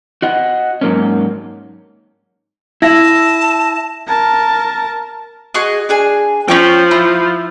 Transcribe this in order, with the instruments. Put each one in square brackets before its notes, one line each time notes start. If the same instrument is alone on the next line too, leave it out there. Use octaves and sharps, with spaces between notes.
[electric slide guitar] F#4 D#5 F#5
G#2 F#3 A#3 C#4
[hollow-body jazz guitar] E4 [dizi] A5 [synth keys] E6 A#6
[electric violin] A#4 A5
[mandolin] F#4 G#4 D#5
D4 G#4 G#5
[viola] F3 [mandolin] C#4 C#5 G5
[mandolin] E4